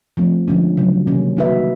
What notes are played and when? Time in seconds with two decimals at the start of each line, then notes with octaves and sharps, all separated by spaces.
0.17 F3 A3 C4
0.48 D3 F3 G#3 C#4
0.77 C#3 F#3 A3
1.07 C3 D#3 G3 A#3 C#4
1.37 A#3 D#4 F#4 B4 E5